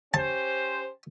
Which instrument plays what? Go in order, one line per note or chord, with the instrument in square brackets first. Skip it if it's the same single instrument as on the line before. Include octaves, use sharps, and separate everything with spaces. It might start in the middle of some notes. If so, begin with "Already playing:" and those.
[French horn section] C#4 G4 C5 [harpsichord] A5